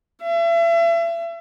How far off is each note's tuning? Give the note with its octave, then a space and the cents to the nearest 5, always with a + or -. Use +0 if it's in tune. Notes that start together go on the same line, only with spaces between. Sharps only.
E5 +35